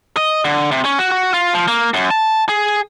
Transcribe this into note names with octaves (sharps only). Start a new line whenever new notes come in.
D#5
D3
C3
C#4
F#4
F#4
F4
F3
A#3
F#2
A5
G#4